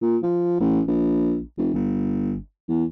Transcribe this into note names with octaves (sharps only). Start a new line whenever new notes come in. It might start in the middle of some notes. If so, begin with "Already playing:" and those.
A#2
F3
A1
A#1
F1
G1
E2